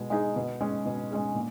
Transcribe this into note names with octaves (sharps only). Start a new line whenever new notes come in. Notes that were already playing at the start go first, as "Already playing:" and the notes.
Already playing: B2 G#3
G#3 D#4 G#4
B2
G#3 C#4 G#4
B2
G#3 C#4 G#4
A#2